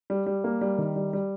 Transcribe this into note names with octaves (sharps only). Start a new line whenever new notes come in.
G3
G3
A#3
G3
D#3
G3
G3